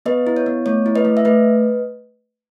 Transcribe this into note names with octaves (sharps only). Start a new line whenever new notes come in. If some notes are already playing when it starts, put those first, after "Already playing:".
B3 B4 D#5
E4
C#5
B3
A3 C#5
E4
B4 D#5
A3
E5
A3 B4 D#5